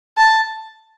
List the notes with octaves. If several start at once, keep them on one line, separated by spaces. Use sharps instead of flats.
A5